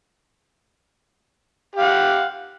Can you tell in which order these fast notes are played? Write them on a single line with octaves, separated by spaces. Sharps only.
G4 F5 F#5